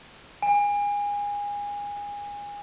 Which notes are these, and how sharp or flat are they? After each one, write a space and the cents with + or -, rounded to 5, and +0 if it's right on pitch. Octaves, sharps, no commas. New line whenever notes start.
G#5 -25